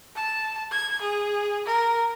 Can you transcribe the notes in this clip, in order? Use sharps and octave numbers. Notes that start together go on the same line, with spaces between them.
A5
G#6
G#4
A#4